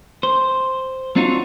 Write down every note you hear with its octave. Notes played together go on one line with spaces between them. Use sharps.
C5
C4 D4 D#4 F4 F#4 C#5